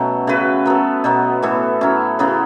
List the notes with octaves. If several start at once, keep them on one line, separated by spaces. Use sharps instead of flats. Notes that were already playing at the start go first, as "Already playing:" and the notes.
Already playing: B2 F#3 A3 C#4
C#3 A3 F#4 B4
F#3 B3 A4
B2 F#3 B3
A2 E3 B3 A4
F#3 C#4 E4
C#3 F#3 B3 E4